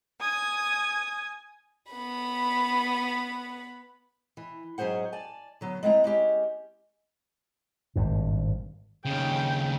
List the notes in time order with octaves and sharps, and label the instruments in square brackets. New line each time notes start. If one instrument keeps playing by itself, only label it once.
[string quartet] G#5 D#6 G#6
[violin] B3 B5
[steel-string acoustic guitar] E3
G#2 F#3 C#4 G#4 C5 F#5
D5 G#5 A5
D3 F#3 B3
G#3 A3 C4 E4 F#5 A#5
G#3 C#4 G4
[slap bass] G#1 G2 A#2
[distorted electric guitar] D#2 C#3 [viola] G5